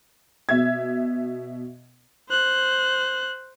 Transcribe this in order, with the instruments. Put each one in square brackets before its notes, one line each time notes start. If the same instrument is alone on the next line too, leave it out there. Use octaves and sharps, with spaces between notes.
[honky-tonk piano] B2 E5 G#6
[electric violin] C5 F#6